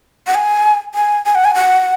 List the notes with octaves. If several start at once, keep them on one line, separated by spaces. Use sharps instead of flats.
F#5
G#5
G#5
G#5
F#5
G#5
F#5